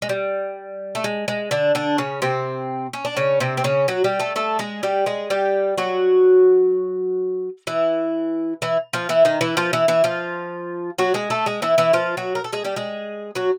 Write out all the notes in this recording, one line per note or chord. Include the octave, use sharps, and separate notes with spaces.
G#3
G3
A3
G#3
G#3
D3 D4
D3 D4
C#3 C#4
C3 C4
C#4
D4
C#3 C#4
C3 C4
C4
C#3 C#4
F#3 F#4
G3 G4
A3 A4
A3 A4
G#3 G#4
G3 G4
G#3 G#4
G3 G4
F#3 F#4
E3 E4
E3 E4
F3 F4
E3 E4
D#3 D#4
E3 E4
F3 F4
E3 E4
E3 E4
F3 F4
F#3 F#4
G#3 G#4
A3 A4
G#3 G#4
E3 E4
E3 E4
F3 F4
F#3 F#4
A#4
A4
G#3 G#4
G3 G4
G#3 G#4
F#3 F#4